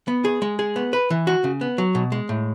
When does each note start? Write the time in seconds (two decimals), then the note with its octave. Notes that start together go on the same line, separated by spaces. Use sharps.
0.08 B3
0.25 G#4
0.42 G#3
0.59 G#4
0.76 B3
0.93 B4
1.10 E3
1.27 F#4
1.44 C#3
1.61 B3
1.78 F#3
1.95 B2
2.12 G#3
2.29 A2